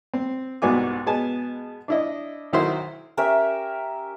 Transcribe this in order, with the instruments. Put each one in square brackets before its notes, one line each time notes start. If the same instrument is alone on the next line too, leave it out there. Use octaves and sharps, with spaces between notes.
[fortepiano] C4
C2 G#2 B3 F#4 G#5 D6
B2 G#3 B3 G#5 A5
D4 E4 D#5
B1 D#3 E4 F#4 C5 C6
[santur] C#4 G4 A#4 E5